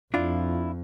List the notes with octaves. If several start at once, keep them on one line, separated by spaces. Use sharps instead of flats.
F2 D4 E4 F4